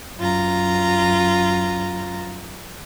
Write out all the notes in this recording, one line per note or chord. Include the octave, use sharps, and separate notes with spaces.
F#2 F4 A#5